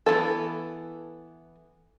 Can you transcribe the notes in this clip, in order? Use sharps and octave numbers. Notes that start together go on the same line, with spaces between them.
E3 F3 B3 A4